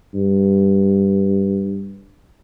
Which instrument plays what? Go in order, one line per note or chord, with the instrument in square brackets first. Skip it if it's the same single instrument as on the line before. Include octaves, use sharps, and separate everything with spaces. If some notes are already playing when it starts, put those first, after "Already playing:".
[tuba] G2